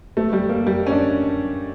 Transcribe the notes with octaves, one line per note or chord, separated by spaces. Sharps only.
A3
G3
A#3
G3
C#4
D4